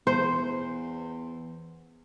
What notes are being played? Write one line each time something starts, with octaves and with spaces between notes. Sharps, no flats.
E2 C5